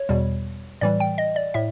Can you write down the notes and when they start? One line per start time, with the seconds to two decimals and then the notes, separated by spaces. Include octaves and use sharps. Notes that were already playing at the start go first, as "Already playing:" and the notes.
Already playing: C#5
0.09 E2 B2 G3
0.81 A2 E3 G3 D5
1.00 G5
1.18 D#5
1.36 D5
1.54 A2 E5